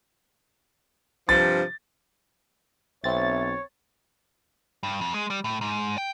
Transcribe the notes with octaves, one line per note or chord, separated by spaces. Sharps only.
G2 C3 F3 A6
B1 C4 C#5 E5 A6
G2
F2
G#3
G3
A2
G#2
G5